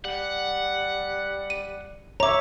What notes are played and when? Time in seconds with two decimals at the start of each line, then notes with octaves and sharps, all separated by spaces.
0.05 G3 F#5
1.50 D#7
2.20 C#5 E5 A#5 D6